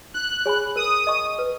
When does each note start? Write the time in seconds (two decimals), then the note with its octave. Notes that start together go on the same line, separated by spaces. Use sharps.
0.14 D#4 F#6
0.46 G#4 C#5 G#5 B5
0.76 A#4 D#6
1.07 D#5 G#5 C#6
1.39 B4